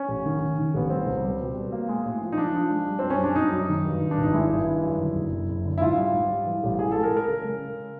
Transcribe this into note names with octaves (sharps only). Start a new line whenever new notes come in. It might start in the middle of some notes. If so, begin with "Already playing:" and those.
Already playing: C#4
A1
D#3
D#3
D#3
A1 B3
G3 C4
C#2
G3
B2
B2
A#3
G#3
A2
F3
D#4
F3 D4
F3
G#3
G3
F#2 C4
C#4
G3 D4
F#2 D#4
F#2
D#3
G2
D#3
D4
G#1
D#4
G#3 E4
G2
D#3
F#2
D3
F#1
F#1
F#1
D3
E4
G#2 F4
G3
G#2
G3
E3
A1
E3 G#4
G#3 A4
A#4
G#3
A#4
C#3
G#3
C#3